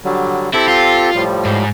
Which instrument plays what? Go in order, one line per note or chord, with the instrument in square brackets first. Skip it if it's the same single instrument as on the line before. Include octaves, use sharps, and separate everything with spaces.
[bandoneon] D3 F#3 G3
[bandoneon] C4 G4 A4 [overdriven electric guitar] E4
[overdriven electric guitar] F4
[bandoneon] A2 F3 G3
[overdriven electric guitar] G#2